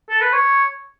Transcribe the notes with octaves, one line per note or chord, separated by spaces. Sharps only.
A4
B4
C#5